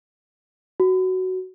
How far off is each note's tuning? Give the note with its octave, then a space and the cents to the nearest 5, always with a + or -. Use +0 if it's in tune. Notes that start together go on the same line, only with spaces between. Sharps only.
F#4 +10